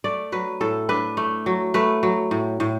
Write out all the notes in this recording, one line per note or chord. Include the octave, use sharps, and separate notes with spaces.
A3 D5
F#3 B4
A2 A4
D4 B4
A3
F#3
A3 B4
F#3
A2
A2